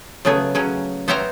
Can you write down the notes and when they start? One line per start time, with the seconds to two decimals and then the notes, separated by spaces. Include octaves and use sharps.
0.25 C#3 F#3 A3 B3 G#4
0.55 C#3 F#3 C#4
1.08 B3 C5 C#5 E5 G5 A#5